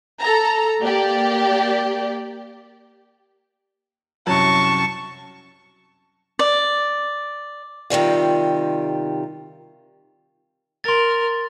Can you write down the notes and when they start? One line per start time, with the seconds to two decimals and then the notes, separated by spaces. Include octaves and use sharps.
0.20 A4 A#5
0.83 A#3 G4 D5
4.27 C2 F#2 F#3 A5 C#6
6.39 D5
7.90 C3 D#3 G3 F4
10.84 A#4 C6 A6